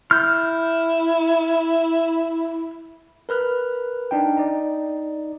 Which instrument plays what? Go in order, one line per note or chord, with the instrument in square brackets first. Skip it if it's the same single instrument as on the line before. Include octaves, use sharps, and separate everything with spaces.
[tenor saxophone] E4 [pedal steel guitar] F6 G6
[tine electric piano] A#4 B4 F6 F#6
D4 D#4 G5
D#4 D5